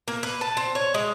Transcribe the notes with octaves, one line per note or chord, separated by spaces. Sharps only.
A#3
B4
A5
C4
C#5
G#3